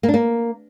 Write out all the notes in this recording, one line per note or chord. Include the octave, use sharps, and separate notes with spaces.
A#3
D4
A#3